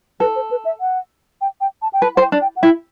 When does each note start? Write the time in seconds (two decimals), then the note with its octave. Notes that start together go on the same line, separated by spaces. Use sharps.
0.20 A4 B4
0.36 C5
0.51 B4
0.65 E5
0.81 F#5
1.41 G5
1.61 G5
1.82 A5
1.93 G5
2.02 B4 A5
2.15 C5 F#5
2.21 G5
2.32 D4
2.41 G5
2.56 F#5
2.63 E4 G5